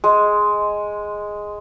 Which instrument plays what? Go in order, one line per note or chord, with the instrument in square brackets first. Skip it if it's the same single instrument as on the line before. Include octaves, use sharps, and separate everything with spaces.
[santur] G#3